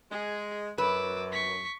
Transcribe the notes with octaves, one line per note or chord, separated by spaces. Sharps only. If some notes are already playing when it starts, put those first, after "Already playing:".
G#3 G#4
F#2 B4 D6 E6
C#6 B6